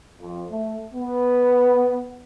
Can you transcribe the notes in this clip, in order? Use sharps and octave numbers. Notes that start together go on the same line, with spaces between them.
F2
A3
B3